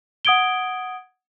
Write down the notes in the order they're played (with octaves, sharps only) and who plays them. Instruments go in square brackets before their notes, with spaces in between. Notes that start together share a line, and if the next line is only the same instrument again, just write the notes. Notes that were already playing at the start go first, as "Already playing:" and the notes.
[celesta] F#5 D#6 G#6 D7 G7